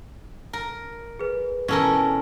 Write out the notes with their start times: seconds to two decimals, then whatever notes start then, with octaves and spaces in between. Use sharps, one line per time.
0.53 A#4
1.19 G#4 B4
1.68 B2 E3 C#4 A4 A#4